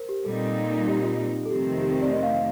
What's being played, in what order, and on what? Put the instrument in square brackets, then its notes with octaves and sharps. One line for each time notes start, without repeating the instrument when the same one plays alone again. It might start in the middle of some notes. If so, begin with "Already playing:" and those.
Already playing: [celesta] A#4 C5
G4
[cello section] A#2 G3 C4 D#4 [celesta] A4
[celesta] G4
F4
A4
[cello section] F2 C3 D#3 A3 C4 [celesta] G4
[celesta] G4
A#4
D5
D#5
F5
F5